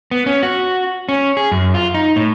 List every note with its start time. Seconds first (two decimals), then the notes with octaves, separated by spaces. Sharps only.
0.11 B3
0.26 C#4
0.43 F#4
1.09 C#4
1.37 G#4
1.52 F#2
1.74 F4
1.94 D#4
2.16 A2